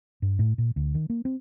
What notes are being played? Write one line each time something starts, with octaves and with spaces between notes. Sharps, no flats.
G2
A2
A#2
D2
D#3
A#3
C4